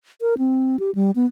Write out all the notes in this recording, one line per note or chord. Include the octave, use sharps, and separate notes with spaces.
A#4
C4
G4
G3
B3